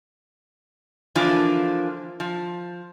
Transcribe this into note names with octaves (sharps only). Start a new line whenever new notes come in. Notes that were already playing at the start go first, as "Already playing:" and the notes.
D3 E3 F3 A#3 D4 F4
F3